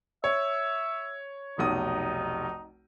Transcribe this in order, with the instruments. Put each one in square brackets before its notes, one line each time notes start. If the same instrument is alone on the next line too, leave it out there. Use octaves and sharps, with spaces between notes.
[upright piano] C#5 [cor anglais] E5
[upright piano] F1 B1 D#6 [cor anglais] D#4